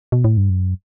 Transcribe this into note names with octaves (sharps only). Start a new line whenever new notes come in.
B2
A2
G2
F#2